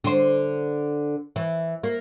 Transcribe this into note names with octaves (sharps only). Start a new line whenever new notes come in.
D3 C5
E3
A#3